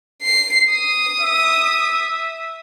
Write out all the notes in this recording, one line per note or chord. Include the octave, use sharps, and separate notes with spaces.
C7
D#6
E5